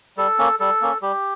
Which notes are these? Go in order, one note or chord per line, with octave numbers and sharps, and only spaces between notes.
G3 A4
A#3 C#4
G3 A4
A#3 C#4
G3 G4